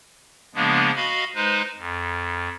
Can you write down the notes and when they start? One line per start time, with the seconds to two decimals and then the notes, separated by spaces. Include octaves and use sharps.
0.55 C#3 F3 G#3 A#3 B3 D4
0.96 F#4 D#5 F5 B5
1.35 G#3 D#4 B4 C5
1.78 F2